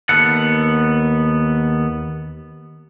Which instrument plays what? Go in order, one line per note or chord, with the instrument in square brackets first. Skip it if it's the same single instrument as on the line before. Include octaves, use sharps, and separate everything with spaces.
[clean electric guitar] D#2 B3 A4 F#5